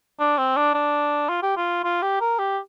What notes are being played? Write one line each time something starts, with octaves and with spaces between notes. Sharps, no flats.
D4
C4
D4
D4
F4
G4
F4
F4
G4
A#4
G4